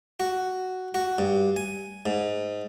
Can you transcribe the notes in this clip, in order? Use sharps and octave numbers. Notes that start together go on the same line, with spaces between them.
F#4
F#4
G2
G#5
G#2